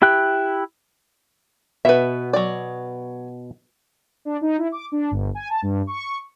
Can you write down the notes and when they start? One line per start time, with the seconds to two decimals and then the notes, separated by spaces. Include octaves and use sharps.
0.02 E4 G4 G5 F#6
1.85 B2 B3 B4 E5
2.33 F#3 D5
4.25 D4
4.41 D#4
4.58 E4
4.72 D6
4.92 D4
5.11 G1
5.35 G#5
5.50 A5
5.62 G2
5.87 C#6